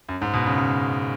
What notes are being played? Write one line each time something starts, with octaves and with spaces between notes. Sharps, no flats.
F#2
G#2
B2
C#3
C#3